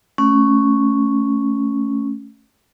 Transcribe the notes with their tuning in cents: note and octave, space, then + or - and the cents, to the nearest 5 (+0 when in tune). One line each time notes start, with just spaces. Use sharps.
A3 +0 C#4 +0